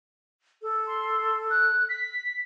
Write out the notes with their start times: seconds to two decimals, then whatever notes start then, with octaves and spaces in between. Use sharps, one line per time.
0.62 A4
0.87 C6
1.50 F#6
1.89 B6